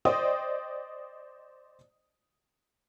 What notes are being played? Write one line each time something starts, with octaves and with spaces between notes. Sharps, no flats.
C5 D5 D#5 G5 D#6